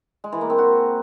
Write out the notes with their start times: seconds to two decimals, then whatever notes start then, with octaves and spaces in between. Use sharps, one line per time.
0.24 G#3
0.32 E3
0.41 A#3
0.50 C4
0.58 F#4